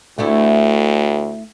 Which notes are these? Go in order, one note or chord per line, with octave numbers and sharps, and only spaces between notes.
D2 A3 D4 E4